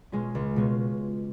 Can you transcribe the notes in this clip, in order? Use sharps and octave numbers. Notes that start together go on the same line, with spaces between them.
B2 G#3 C#4 F4
C#2
B2 G#3 C#4 F4